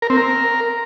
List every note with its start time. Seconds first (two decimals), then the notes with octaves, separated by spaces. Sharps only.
0.02 A#4
0.10 C4
0.18 A#4